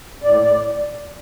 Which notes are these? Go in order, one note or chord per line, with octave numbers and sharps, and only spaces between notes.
A2 D5
D5